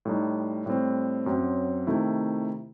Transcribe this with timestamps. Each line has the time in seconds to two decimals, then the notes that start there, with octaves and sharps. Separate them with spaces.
0.05 A2 G3 D#4
0.66 A2 G3 C4
1.26 F#2 F#3 C4
1.87 C3 D#3 A3 E4